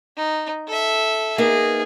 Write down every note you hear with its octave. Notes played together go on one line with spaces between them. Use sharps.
D#4
A4 E5
A#3 B3 D#4 G#4